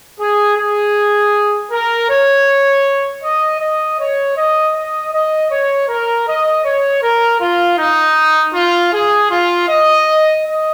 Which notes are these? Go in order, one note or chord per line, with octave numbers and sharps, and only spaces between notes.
G#4
G#4
A#4
C#5
D#5
D#5
C#5
D#5
D#5
D#5
C#5
A#4
D#5
C#5
A#4
F4
D#4
F4
G#4
F4
D#5
D#5